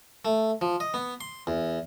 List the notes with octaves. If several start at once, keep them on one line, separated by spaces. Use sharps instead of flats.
A3
F3
D#5
B3
C6
E2